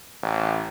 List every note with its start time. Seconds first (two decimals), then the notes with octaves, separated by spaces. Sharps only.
0.23 A1